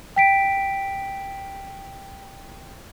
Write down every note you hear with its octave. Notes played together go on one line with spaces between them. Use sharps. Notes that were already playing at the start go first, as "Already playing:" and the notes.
G5 B6 D7